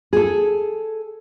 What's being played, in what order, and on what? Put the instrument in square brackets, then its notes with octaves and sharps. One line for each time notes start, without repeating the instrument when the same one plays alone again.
[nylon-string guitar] G#4 A4